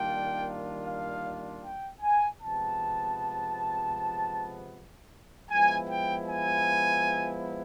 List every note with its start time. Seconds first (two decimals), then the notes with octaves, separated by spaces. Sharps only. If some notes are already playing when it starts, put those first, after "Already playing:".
Already playing: D#3 G3 A#3 D4 F4 G5
0.85 F5
1.63 G5
2.02 G#5
2.40 C3 F3 G#3 B3 A5
5.51 F3 G#3 B3 E4 G#5
5.90 G5
6.28 G#5